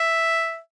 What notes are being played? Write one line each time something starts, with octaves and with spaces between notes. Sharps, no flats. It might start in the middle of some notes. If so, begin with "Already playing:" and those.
Already playing: E5